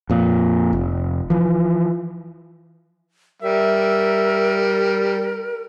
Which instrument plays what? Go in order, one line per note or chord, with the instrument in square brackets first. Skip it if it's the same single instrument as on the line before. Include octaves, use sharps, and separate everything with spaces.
[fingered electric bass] F2 A#2
F1
E3 F3
[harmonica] G3 [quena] A#4 [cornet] E5